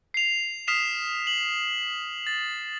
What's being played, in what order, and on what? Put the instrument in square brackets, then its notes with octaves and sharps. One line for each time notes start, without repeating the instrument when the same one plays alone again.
[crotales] C7 F7
D#6 F6 B6 C7 E7 F7
F#7
A6